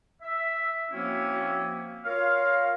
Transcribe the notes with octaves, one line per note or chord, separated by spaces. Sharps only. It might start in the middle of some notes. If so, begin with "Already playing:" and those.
E5
F3 A#3 C4 C#4 E4 F#4
F4 A#4 C#5 F5